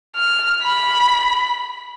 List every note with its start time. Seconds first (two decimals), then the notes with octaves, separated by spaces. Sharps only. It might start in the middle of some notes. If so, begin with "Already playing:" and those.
0.16 F6
0.64 B5